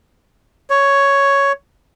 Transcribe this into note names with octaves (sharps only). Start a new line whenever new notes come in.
C#5